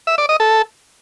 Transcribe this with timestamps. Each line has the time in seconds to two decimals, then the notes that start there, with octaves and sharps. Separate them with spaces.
0.07 E5
0.18 D5
0.29 D#5
0.40 A4